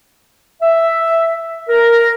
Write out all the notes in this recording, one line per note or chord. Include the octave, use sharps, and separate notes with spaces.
E5
A#4